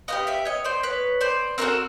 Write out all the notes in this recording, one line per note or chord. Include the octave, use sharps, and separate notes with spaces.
B3 D#4 G4 D#5 F5
D5 E5
C#5 D#5
C5 D5
B4 C#5
C5 D5
C4 D#4 F#4 A4 A#4 C5